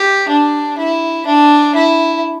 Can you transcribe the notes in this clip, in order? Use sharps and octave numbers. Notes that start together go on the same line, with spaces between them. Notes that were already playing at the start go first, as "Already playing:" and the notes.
Already playing: G4
D4
E4
D4
E4